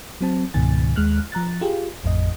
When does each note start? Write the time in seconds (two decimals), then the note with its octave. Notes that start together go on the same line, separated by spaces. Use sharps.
0.21 F#3 C4 A5
0.54 C#2 G#2 B2 D#3 G#5 A6
0.96 D#2 G#3 F6 F#6
1.32 F3 A#5 F#6 A6
1.61 F4 G4 G#4
2.03 A1 F2 A2 D#5